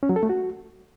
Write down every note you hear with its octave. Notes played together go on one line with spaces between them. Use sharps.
C#4
F#3
A4
A3
F#4